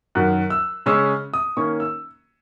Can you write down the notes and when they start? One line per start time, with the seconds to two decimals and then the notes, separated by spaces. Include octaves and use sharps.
0.15 F#2 D#3 F#3 F#6
0.50 E6
0.86 C#3 G#3 C#4 E6
1.34 D#6
1.57 D#3 A#3 C#4 C#6
1.80 E6